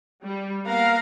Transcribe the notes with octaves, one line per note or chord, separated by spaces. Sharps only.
G3
A#3 B3 A#4 F5 F#5 A#5